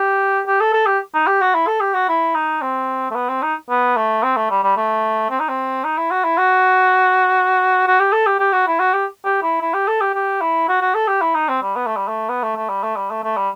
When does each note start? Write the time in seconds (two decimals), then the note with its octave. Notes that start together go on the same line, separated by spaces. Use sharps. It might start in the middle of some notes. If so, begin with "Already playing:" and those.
Already playing: G4
0.47 G4
0.61 A4
0.74 A4
0.87 G4
1.14 D#4
1.27 G4
1.41 F#4
1.55 E4
1.67 A4
1.81 G4
1.94 F#4
2.09 E4
2.35 D#4
2.62 C4
3.11 A3
3.15 B3
3.29 C4
3.43 D#4
3.70 B3
3.97 A3
4.23 C4
4.37 A3
4.51 G3
4.64 G3
4.77 A3
5.30 C4
5.40 D#4
5.49 C4
5.84 D#4
5.98 E4
6.12 F#4
6.24 E4
6.38 F#4
7.87 F#4
8.00 G4
8.13 A4
8.27 G4
8.40 G4
8.53 F#4
8.67 E4
8.80 F#4
8.93 G4
9.25 G4
9.43 E4
9.61 E4
9.74 G4
9.88 A4
10.01 G4
10.15 G4
10.41 E4
10.69 F#4
10.81 F#4
10.95 A4
11.08 G4
11.22 E4
11.35 D#4
11.49 C4
11.62 G3
11.76 B3
11.87 A3
11.97 G3
12.08 A3
12.29 B3
12.43 A3
12.56 A3
12.69 G3
12.83 A3
12.97 G3
13.11 A3
13.24 A3
13.37 G3